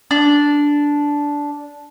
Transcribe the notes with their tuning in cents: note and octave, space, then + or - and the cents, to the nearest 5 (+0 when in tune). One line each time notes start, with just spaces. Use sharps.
D4 -10